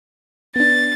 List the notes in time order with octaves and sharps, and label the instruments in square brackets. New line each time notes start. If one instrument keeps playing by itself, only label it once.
[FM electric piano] B3 D4 [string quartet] A6